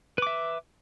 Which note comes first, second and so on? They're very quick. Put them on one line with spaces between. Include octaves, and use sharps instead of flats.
B4 D6 E5